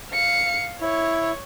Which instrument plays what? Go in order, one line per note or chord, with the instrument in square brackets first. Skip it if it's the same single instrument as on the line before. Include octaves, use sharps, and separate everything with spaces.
[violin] F5 C#7
[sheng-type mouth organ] E4 [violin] C#5